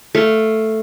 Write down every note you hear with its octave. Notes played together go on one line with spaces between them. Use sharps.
A3 F5